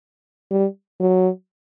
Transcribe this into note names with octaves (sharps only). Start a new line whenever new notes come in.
G3
F#3